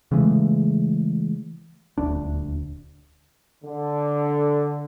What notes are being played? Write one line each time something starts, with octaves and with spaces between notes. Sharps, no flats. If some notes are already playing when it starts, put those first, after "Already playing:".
C#3 E3 G#3 A3
D#1 D2 D4
D3